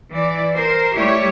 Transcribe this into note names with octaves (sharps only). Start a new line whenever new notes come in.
E3 D5
A#4 C5
G3 A3 E4 G4 C#5